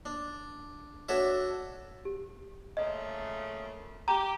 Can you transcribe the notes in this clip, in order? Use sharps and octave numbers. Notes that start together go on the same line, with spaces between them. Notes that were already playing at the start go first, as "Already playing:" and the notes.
D4
D4 F#4 A4 C#5 E5
G4
A#2 C#3 A3 D#5
G4 A#5